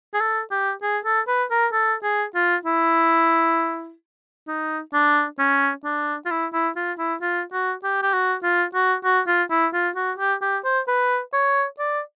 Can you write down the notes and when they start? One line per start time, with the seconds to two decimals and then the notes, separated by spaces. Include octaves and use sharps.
0.14 G#4
0.20 A4
0.51 G4
0.82 G#4
1.05 A4
1.28 B4
1.51 A#4
1.73 A4
2.03 G#4
2.35 F4
2.65 E4
4.48 D#4
4.93 D4
5.39 C#4
5.84 D4
6.25 F4
6.30 E4
6.53 E4
6.76 F4
6.98 E4
7.21 F4
7.52 F#4
7.83 G4
8.03 G4
8.13 F#4
8.43 F4
8.74 F#4
9.04 F#4
9.27 F4
9.51 E4
9.73 F4
9.96 F#4
10.18 G4
10.41 G4
10.64 C5
10.88 B4
11.33 C#5
11.79 D5